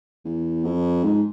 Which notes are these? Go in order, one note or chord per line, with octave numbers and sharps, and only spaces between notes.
E2
F2
G#2